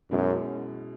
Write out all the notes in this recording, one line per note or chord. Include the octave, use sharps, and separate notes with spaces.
F#2 B2 G#3 C#4 E4